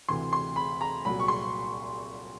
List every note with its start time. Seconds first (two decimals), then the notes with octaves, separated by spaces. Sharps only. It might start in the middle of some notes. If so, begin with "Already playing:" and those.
0.08 D2 C3 E3 C6
0.33 C6
0.56 B5
0.81 A#5
1.05 C2 A#2 F#3 B5
1.19 C#6
1.28 C6